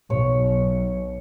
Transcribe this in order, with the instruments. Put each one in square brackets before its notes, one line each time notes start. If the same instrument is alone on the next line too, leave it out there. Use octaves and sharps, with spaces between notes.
[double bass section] B1 [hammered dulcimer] C#5